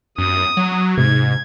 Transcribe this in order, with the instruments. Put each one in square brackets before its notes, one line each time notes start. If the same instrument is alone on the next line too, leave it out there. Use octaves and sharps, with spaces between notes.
[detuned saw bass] F#2 [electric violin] D#6
[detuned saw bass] F#3
[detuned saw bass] G#2 [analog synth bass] C3 [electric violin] G#6